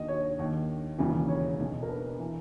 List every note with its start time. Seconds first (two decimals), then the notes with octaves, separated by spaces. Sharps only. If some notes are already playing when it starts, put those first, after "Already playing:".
Already playing: D#2 D#3 D#5
0.08 C#5
0.39 D#2 D#3
0.98 E1 D#2 C#3 E3
1.29 C#5
1.59 B1 B2
1.83 A#4
1.89 B4
2.19 E3